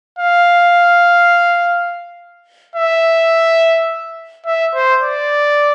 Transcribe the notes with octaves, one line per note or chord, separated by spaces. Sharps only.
F5
E5
E5
C5
D5